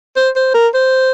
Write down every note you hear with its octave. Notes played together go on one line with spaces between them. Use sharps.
C5
C5
A#4
C5